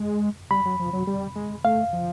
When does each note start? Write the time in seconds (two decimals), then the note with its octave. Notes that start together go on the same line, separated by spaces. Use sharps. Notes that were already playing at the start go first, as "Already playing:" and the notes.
Already playing: G#3
0.51 G3 B5
0.65 F#3
0.80 F3
0.93 F#3
1.07 G3
1.36 G#3
1.64 A3 F5
1.93 F3